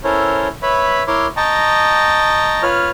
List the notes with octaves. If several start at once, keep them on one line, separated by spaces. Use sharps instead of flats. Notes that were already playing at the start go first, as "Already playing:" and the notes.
C#4 E4 A4 A#4 C5 C#5
B4 C#5 E5 B5
E4 A#4 C#5 C6 D6
D#5 G5 A5 A#5 C#6
F4 B4 C#5 F6